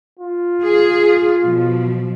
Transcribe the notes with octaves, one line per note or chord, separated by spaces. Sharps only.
F4
G#4
B2 F3